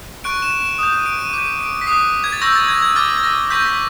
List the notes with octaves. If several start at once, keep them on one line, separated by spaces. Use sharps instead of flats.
C#6 F#6 D7
E7
E7
D#6 G6 E7
D#7
D7
D#7
D6 G6 D#7
D7
B6
D#6 F#6 C7
G#6
A6
C#6 E6 G6 A#6
A6
G#6
G#6
D6 F6 A6
A6
A#6
C#6 E6 G6 B6
B6